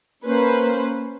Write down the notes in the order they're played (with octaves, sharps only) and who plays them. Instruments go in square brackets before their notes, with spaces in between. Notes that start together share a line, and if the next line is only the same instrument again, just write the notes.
[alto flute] A#3 [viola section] C#4 B4 C5